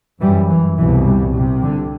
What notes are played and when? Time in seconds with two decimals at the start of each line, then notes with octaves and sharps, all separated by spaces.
0.21 F#2 E3 G3
0.49 E3
0.77 C2 B2 E3
1.06 E3 G3
1.35 C2 C3
1.63 D3